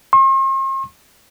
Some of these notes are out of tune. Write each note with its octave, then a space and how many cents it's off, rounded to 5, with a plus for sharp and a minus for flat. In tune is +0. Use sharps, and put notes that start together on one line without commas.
C6 +45